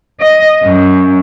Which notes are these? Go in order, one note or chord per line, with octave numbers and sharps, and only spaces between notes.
D#5
F#2